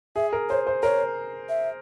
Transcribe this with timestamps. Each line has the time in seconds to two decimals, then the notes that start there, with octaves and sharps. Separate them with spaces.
0.16 G#4 E5
0.33 A#4
0.49 C5 C#5
0.67 C5
0.83 A#4 C#5
1.49 E5